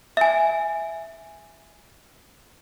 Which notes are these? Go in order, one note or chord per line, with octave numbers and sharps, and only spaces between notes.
E5 G#5